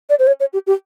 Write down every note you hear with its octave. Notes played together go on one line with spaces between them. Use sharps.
D5
C5
C#5
C#5
G4
G4